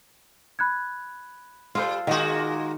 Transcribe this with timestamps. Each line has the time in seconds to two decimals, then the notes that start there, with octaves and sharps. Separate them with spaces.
0.59 B5 F#6 G#6
1.75 G3 F4 A4 C5
2.07 A#2 D#3 G#3 D#4 F#4